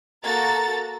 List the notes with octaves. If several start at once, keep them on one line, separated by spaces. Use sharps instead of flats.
A#3 F#4 A4 A#5 A6